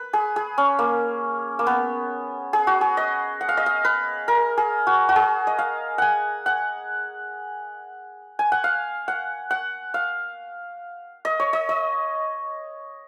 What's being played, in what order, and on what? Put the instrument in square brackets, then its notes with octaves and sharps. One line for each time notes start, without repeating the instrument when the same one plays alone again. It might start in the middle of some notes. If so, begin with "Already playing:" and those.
Already playing: [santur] B4
G#4
G#4
C#4
A#3
A#3
B3
G#4
F#4
G#4
D#5
F#5
F5
D#5
F5
B4
A#4
G#4
F#4
F#4
G#4
D#5
F5
F#5 G#5
F#5
G#5
F#5
F5
F#5
F#5
F5
D#5
C#5
D#5
D#5